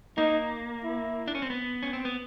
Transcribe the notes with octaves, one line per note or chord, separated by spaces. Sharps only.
A#3 D#4
E4
D4
C#4
C4
B3
C#4
C4
B3